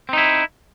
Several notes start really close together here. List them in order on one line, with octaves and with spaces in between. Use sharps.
C4 D#4 E4